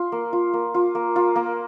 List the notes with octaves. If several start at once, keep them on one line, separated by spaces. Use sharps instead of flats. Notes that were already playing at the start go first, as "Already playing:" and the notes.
Already playing: F4
A#3
F4
A#3
F4
A#3
F4
A#3